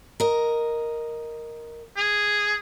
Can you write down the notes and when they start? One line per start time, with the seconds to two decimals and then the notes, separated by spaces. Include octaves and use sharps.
0.20 A#4 D#5
1.97 G#4